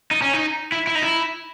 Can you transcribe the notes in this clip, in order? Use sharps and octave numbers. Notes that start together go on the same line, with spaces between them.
D#4
C#4
D#4
E4
E4
D#4
E4